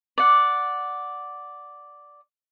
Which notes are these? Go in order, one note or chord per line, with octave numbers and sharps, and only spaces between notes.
D5 F#5